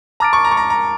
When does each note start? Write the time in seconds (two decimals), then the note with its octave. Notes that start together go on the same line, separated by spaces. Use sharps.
0.20 A5 A#5 D6 F6 A6 D7
0.33 C#6
0.44 A#5
0.51 C#6
0.57 A#5
0.70 A#5